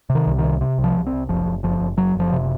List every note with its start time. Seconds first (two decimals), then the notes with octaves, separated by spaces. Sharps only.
0.10 C3
0.15 D#3
0.27 C2
0.38 C3 D#3
0.61 C3
0.78 C2
0.84 F3
0.96 C2
1.06 C4
1.13 C2
1.29 F#1 F3
1.46 F#1
1.63 F#1 F3
1.80 F#1
1.97 F#1 F#3
2.15 F#1 F3
2.32 C3